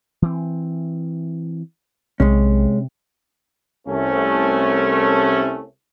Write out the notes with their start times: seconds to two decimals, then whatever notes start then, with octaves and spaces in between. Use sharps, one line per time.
0.22 E3 C4
2.20 B1 C3 G#3 C#4
3.88 C2 A3 C#4